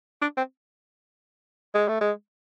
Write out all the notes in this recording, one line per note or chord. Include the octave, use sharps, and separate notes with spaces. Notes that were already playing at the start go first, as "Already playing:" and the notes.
D4
C4
G#3
A3
G#3